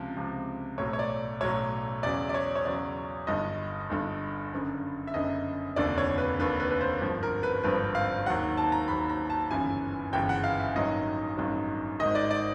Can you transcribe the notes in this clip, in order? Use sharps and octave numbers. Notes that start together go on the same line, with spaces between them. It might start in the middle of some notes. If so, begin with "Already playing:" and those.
Already playing: C#2 C3 F3
C#2 C3 F3
B1 A2 F#3 C#5
C#5
D5
B1 A2 F#3 C#5
E2 C#3 F#3 D5
D5
C#5
C#5
E2 C#3 F#3 D5
G1 G2 D3 D#5
G1 G2 D3
F#1 F#2 D3
E5
F#1 F#2 D3 D#5
F1 D#2 D3 D5
C#5
B4
F1 D#2 D3 B4
B4
B4
C5
G#1 G2 D3 F3
A#4
B4
G#1 G2 D3 F3 B4
F5
D#2 D#3 F#3 F#5
A5
A#5
D#2 D#3 F#3 B5
A#5
A5
G1 F#2 C#3 E3 G#5
G1 F#2 C#3 E3 G5
F#5
F5
E5
A1 G2 D#3 F#3 D#5
A1 G2 D#3 F#3
G#1 G#2 D#3 D#5
D5
D5